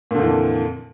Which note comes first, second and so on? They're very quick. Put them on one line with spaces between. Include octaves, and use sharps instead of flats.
A#2 D3 F2 E3